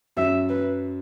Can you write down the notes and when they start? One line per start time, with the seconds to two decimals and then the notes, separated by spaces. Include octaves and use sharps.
0.17 F#2 F#3 E5
0.49 B4